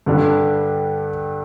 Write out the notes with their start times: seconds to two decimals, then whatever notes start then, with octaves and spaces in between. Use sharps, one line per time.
0.06 G2 D3 G3 D4